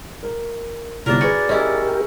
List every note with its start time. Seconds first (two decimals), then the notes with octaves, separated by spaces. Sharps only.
0.23 A#4
1.06 G1 C2 A#4 D5
1.21 F#4 G#4 B4 C#7
1.49 C#4 E4 G4 A#4 C#5 D#5